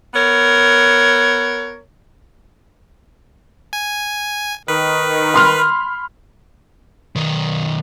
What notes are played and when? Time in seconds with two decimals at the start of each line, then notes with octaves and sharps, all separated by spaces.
0.14 B3 A#4 C#5
3.73 G#5
4.68 D#3 B4
5.34 B5 C6 F6
7.16 B1 D#3